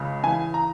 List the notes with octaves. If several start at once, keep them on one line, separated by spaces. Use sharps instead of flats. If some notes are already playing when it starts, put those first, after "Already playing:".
Already playing: C#2 C#3
E3 G#5
A#5